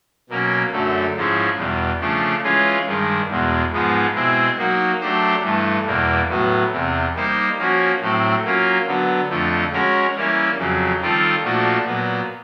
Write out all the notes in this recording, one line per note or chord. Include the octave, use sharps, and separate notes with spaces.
B2 F#3 A#3 C#4
F#2 D3 F#3 A3
G#2 F3 G#3 C#4 E4
E2 B2 G3
C#3 F3 A3 D4
E3 G#3 C#4 F4 G#4
G2 D#3 G#3
E2 B2 G#3
G#2 F3 G#3 B3
B2 G#3 C4 E4 G#4
F#3 A#3 D#4 F#4
F#3 A3 D4 G4 C5
G2 E3 A3
E2 B2 G3 A#3
A2 F#3 B3
E2 C3 E3
G3 A#3 D#4 G4 C5
F3 A#3 C#4 F#4
A2 F#3 A3 C4
F#3 A#3 C#4 F4 A#4
D3 F#3 B3
F2 D3 F3 A3
G#3 C#4 F#4 A#4 C#5
E3 G3 A#3 C#4 E4
F2 C#3 F#3
D#3 G3 C4 F4 A4
A#2 F3 A3 D4 F#4
A#2 F#3 B3